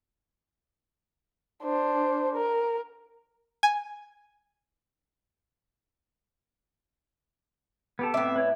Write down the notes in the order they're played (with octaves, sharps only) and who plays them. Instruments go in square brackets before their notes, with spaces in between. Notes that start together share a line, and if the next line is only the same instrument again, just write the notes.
[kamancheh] D4 C5
A#4
[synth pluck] G#5
[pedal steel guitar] B3 G4 A4
[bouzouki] A2 E5 [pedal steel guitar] B3 C4 D6
[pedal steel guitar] B4 C#5 D5